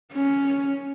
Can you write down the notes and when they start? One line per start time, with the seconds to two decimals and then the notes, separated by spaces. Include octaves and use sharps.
0.13 C#4